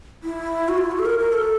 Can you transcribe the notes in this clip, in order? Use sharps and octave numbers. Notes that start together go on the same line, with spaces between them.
E4
F#4
F4
F#4
A4
A#4
A#4
A4